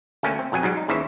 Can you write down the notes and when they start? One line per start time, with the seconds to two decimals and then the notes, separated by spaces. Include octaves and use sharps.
0.23 D2 A3 A#3 C#4 G5 G#5
0.39 C4
0.52 B1 F2 F#3 G#5
0.63 G#2 F#3 G3
0.77 D#4
0.88 D#2 C#3 E3 C5 E5